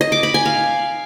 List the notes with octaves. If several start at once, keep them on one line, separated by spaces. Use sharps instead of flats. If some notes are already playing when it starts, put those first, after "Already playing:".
D#5
D6
B5
G#5
F5